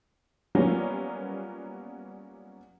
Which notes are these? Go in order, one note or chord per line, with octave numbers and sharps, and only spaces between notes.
F#3 G3 A#3 B3 C#4 F4